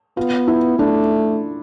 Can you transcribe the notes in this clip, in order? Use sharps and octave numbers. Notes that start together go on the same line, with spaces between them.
B3 F4
E4
A3 D4